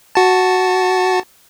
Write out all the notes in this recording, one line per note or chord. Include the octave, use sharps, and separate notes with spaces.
F#4 A5